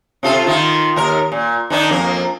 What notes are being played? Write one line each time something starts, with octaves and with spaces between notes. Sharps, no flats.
C3 F4 A4
D#3 F4
D#2 A#4
A#2
D#3 D4 D#4
F2 A#3